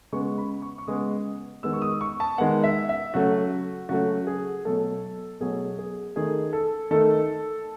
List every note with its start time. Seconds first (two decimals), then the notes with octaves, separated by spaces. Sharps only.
0.12 C#3 G#3 B3 C#6
0.38 B5
0.62 C#6
0.78 C#6
0.87 C#3 G#3 B3 D#6
1.63 D#3 G#3 B3 E6
1.73 C#6
1.82 D#6
2.01 C#6
2.20 A5
2.38 D#3 G#3 B3 F#5
2.64 E5
2.89 E5
3.14 C#3 F#3 A3 F#4
3.89 C#3 F#3 A3 F#4
4.27 G#4
4.65 B2 F#3 A3 A4
5.40 B2 F#3 A3 G#4
5.79 G#4
6.16 D#3 A3 G#4
6.53 A4
6.91 D#3 A3 A4